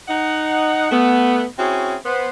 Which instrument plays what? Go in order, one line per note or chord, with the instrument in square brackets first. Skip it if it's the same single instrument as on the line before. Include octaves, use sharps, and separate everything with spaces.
[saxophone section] D#4 F#5
A3 B3
C4 C#4 E4 F#4 G#4
B3 C5